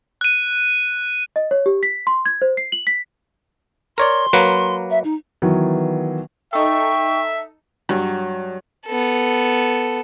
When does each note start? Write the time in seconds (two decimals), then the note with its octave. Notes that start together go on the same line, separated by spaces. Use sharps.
0.21 F#6 D#7
1.36 D#5
1.51 C#5
1.66 G4
1.83 B6
2.07 C6
2.25 G#6
2.42 C5
2.57 C7
2.72 F#7
2.87 B6
3.98 A#4 C#5 D5 C6
4.33 F#3 A#3 B4
4.90 E5
5.04 D#4
5.42 D#3 E3 F#3 B3
6.53 D#4 A4 E5 G5 C#6
7.89 G2 F#3
8.86 B3 A4